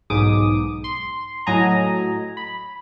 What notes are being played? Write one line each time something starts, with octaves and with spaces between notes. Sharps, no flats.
B1 G#2 D6 D#6
C6
A2 F#3 D#5 G#5 A#5
B5